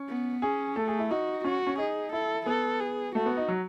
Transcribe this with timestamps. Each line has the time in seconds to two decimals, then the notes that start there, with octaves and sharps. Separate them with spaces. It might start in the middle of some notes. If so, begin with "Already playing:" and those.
Already playing: C#4
0.09 B3
0.42 C#4 G#4
0.76 A3 A4
0.88 G#4
0.99 E4
1.10 D#4 F#4
1.44 C#4 F#4
1.67 C#4
1.78 D#4 G#4
2.12 E4 A4
2.46 B3 A4
2.80 G#4
3.15 A3 F#4
3.26 B3
3.37 D#4
3.48 F#3